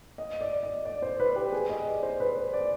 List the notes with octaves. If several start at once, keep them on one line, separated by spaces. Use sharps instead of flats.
D#5
D5
D#5
D5
C5
B4
G4
G#4
D#5
D5
C5
B4
C5
D5